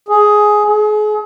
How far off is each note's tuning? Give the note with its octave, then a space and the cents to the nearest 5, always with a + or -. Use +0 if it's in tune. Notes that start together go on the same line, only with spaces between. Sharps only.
G#4 +10
G#4 +35